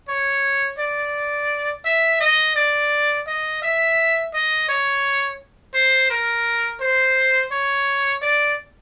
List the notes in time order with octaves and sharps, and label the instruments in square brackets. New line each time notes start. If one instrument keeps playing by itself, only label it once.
[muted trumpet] C#5
D5
E5
D#5
D5
D#5
E5
D#5
C#5
C5
A#4
C5
C#5
D5